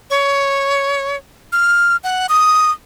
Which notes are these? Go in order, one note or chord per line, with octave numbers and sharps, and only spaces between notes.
C#5
F6
F#5
D#6